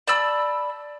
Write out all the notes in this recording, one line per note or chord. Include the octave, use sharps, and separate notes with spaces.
D5 A5 B5 E6